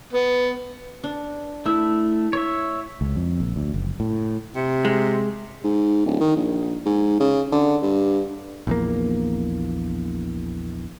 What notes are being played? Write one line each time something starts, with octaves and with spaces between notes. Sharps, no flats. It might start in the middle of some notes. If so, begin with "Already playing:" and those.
B3
D4
A3 E4 E6
C#5 E5
C#2
F2
A#1
D2
F#1
A2
C3
G#3
G#2
D1
D#3
A#1
G#2
C#3
D3
G2
A#1 E2 A#3